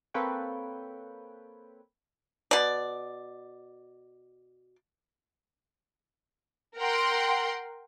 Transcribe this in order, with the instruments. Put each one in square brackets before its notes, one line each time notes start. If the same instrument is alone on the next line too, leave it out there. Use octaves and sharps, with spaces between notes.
[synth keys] A#3 C4 A4 B4 C#5 G5
[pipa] B2 D5
[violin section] A#4 F#5 G5 C6